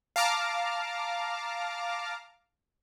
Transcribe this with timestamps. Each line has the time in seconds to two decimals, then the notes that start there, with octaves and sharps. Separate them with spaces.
0.16 F5 A5 A#5 D6 F6